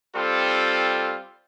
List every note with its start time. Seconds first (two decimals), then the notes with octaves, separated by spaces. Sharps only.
0.16 G3 C4 F4 A4